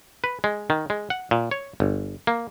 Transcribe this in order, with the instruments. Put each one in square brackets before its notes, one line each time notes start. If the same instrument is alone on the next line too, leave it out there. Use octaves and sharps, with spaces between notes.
[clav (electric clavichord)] B4
G#3
D#3
G#3
F#5
A#2
C#5
G1
A#3